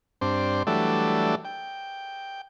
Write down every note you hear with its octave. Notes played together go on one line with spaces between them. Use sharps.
G2 C4 D4 C5
E3 F#3 G3 A3 D4 A4
G5